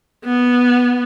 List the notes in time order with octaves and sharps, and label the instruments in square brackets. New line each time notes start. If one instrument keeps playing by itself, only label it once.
[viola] B3